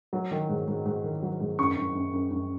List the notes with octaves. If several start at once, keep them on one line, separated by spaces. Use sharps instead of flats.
F#3
D#3
G#2
G#2
G#2
D#3
F#3
G#2
F#2 C#6
F#2
F#2
F#2
F#2